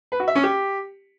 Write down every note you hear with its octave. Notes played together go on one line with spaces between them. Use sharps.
B4
F#4
E5
C#4
G4